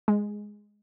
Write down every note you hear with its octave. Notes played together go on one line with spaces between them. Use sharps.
G#3